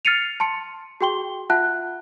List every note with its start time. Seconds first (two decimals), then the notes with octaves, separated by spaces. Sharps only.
0.05 F6 A6 C7 C#7 D#7 F7
0.40 A5 C6 C#7
1.01 F#4 G#4 G5 C6 G7
1.50 F4 E5 F#5 A5 F#6